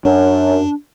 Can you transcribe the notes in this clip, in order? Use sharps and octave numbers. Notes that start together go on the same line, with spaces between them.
F#2 D4